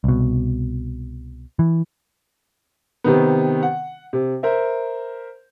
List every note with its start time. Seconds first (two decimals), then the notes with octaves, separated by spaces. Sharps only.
0.04 C2 B2
1.59 E3
3.04 C3 D#3 B3
3.63 F#5
4.13 C3
4.43 A#4 C5 E5